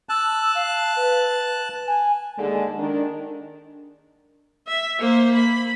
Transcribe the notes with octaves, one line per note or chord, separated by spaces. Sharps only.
A5 E6 F#6
F5
B4
G#5
D#2 D3 G#3
D#3 D4
E5
A#3 C5
B5